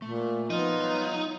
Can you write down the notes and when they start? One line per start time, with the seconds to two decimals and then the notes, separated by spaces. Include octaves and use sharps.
0.02 A#2 A3
0.50 F3 B3 D#4 F4
0.82 G3 C#5 A#5